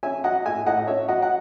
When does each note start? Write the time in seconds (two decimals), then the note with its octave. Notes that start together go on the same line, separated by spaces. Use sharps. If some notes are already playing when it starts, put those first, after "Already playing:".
0.03 C#4 E5 G#5
0.24 F#3 D#5 F#5
0.45 A2 E5 G#5
0.66 A2 D#5 F#5
0.87 C#4 C#5 E5
1.08 F#3 D#5 F#5
1.22 F#5